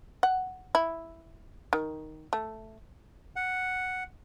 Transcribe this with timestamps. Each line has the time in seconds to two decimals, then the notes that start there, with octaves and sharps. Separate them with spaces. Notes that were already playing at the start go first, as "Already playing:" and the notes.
0.23 F#5
0.75 E4
1.73 D#3
2.33 A3
3.36 F#5